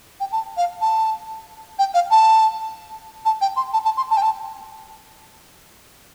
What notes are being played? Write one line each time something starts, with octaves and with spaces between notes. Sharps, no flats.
G5
A5
F5
A5
G5
F5
A5
A5
G5
C6
A5
A5
C6
A5
G5
A5